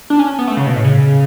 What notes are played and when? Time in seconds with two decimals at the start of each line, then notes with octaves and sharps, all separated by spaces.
0.10 D4
0.19 C#4
0.39 B3
0.48 A3
0.57 C#3
0.67 B2
0.76 A2
0.84 C#3